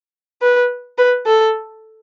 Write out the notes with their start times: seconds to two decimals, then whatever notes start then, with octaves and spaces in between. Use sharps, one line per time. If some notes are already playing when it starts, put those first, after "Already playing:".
0.42 B4
0.98 B4
1.26 A4